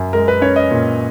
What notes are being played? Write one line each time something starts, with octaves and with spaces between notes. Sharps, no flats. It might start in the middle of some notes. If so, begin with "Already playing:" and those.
Already playing: F#2
G#3 A#4
B4
C#4 C#5
D#5
A#2